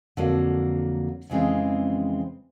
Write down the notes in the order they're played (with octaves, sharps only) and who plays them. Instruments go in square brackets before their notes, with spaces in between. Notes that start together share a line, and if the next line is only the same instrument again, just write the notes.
[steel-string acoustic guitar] F2 D3 F#3 A#3
F2 C#3 E3 G#3 C4